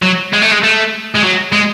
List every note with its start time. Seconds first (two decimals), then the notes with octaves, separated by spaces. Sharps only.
0.02 F#3
0.33 G#3
0.42 A3
0.51 G#3
0.63 A3
1.16 G#3
1.23 F#3
1.53 G#3